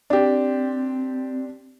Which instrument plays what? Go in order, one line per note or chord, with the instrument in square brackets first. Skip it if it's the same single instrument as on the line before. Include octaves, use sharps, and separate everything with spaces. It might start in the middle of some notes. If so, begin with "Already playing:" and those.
[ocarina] C4 [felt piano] D4 G4